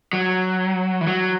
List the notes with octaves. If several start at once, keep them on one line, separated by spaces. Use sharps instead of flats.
F#3
E3
F#3